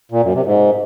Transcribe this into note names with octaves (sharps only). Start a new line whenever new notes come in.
A#2
F#2
C3
G#2